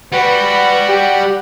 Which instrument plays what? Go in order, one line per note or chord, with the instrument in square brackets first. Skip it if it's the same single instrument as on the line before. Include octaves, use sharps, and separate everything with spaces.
[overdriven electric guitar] G3 [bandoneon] F#4 F#5 [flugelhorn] B4
[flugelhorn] G4